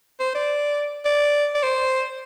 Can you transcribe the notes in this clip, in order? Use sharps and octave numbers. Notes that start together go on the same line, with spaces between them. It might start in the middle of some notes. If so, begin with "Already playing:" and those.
C5
D5
D5
D5
C5